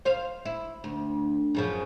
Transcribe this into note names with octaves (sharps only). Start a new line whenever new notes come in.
C5 F5
E4
D2
F#2 C#3 F3